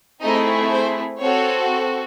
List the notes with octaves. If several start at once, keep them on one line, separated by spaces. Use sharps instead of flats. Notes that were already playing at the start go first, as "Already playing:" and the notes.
A3 C4 D#4 E4 G#4 D#5
C5
C4 F#4 A4 C#5